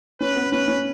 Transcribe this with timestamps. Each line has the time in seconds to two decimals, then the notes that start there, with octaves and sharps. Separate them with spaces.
0.21 C#4 B4
0.36 B3
0.52 C#4 B4
0.68 C#4